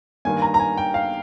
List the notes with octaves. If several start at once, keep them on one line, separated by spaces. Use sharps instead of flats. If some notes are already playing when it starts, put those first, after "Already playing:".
G2 D#3 A#3 G#5
A#5
A#5
G#5
G5
F5